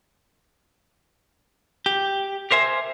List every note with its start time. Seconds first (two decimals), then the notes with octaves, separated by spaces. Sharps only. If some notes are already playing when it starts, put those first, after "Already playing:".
1.86 G4
2.51 G4 A#4 C5 E5 G#5